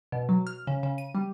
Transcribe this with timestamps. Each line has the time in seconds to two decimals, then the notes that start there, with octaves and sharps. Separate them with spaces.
0.12 B2
0.29 F#3
0.47 F6
0.67 C#3
0.83 C#3
0.98 D#7
1.15 G3